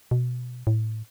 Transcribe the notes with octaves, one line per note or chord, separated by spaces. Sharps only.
B2
A2